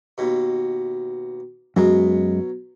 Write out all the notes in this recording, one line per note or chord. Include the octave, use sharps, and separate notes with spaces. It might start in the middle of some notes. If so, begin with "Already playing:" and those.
D#2 B2
F#2 B2 F#3 G#3